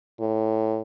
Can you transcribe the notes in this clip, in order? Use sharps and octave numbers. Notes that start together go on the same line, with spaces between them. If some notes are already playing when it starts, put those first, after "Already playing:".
A2